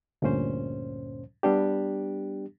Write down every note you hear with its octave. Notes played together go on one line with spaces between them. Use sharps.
D2 G2 A#2 C#4 C5
G3 B3 D4 G4